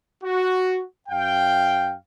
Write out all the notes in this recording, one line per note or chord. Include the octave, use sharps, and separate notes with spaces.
F#4
F#2 F5 G5